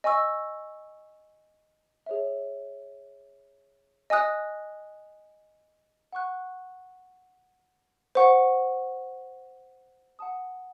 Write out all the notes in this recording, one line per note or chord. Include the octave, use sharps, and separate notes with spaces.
D#5 G#5 C#6 E6
G#4 C#5 E5
D#5 G#5 D#6 F#6
F#5 C#6 F#6
C5 F#5 C#6
F#5 A5 D#6